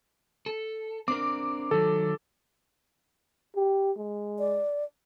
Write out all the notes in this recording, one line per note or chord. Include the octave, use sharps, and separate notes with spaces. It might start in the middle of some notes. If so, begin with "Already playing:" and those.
A4
C4 D4 A#4 D6
D#3 F#3 A4
G4
G#3
D5